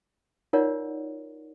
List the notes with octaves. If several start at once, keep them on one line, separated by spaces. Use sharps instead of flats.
D#4 F4 A#4 C#5 D5 F#5